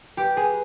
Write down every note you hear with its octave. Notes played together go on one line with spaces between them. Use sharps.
G4 B4
G#4